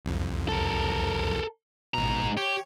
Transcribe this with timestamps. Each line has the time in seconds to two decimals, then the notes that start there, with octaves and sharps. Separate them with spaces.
0.05 C2 F2
0.48 A4 A#4
1.94 A1 G#2 B2 A#5
2.37 G4 C#5